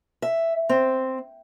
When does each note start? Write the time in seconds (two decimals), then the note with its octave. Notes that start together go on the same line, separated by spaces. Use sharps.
0.22 E5
0.69 C4